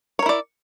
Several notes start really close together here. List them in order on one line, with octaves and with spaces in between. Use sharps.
C#5 A#4 E4 D5